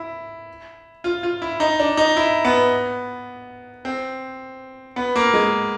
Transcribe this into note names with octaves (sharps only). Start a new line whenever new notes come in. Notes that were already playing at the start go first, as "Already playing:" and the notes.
Already playing: E4
F4
F4
E4
D#4
D4
D#4
E4
B3
C4
B3
A#3
G#3